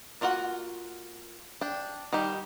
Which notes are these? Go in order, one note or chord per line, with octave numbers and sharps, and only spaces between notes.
A#3 D4 F4 F#4 F#5
D4 G5
D#3 G3 G4